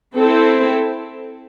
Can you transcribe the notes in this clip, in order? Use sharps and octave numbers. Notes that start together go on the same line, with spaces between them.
C4 E4 A4 C5